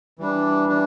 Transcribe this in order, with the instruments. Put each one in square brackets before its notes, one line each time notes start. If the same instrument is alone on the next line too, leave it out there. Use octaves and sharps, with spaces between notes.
[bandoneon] E3 G3 D4
E3 G3 D4